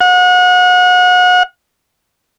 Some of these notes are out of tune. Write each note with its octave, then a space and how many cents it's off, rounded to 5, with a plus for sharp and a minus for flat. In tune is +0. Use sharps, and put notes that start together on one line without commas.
F#5 -35